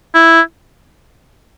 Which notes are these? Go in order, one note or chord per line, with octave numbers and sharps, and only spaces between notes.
E4